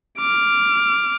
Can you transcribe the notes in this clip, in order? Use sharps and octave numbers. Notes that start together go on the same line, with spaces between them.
D6 F6